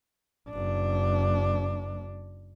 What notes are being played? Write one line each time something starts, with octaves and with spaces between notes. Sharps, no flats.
F#1 D4